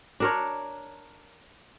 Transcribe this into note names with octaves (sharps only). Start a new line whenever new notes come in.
D4 A#4 C#5